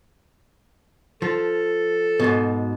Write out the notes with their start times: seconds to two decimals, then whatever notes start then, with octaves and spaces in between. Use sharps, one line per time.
1.22 F3 A4
2.20 G#2 B2